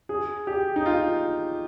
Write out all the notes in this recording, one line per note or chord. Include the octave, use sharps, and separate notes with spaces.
G#4
G4
D#4
F4